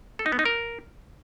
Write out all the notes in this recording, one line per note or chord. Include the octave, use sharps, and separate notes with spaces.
A4
D#4
B3
D#4
A#4